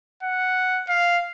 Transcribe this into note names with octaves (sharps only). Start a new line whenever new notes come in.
F#5
F5